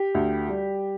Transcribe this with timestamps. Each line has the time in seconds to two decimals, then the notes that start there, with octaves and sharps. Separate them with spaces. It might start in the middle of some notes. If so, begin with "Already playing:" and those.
Already playing: G4
0.15 D2
0.48 G3